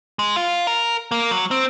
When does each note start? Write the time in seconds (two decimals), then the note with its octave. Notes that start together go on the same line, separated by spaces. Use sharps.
0.19 G#3
0.36 F4
0.67 A#4
1.12 A#3
1.31 F#3
1.51 C4